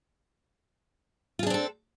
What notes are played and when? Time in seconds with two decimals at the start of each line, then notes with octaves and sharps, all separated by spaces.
1.39 F4
1.43 G#4
1.47 D4
1.50 C4
1.54 A4